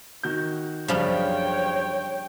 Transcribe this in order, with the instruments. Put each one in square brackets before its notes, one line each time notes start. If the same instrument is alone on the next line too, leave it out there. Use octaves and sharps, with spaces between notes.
[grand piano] D#3 F#4 G6
[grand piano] F#2 C#3 [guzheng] F3 G3 D4 [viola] C#5 G5